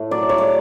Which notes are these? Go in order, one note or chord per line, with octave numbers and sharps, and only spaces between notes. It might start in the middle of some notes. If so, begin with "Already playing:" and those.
Already playing: A2 A3
F#3 D5
C#5
D5